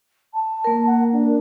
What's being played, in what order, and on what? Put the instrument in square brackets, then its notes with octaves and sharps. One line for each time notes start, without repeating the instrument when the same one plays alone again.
[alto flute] A5
[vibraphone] A#3 A#4
[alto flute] F#5
D4